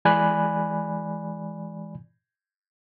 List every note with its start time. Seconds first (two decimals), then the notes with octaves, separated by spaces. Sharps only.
0.05 E3 G#3 D5 G#5 B5 F#6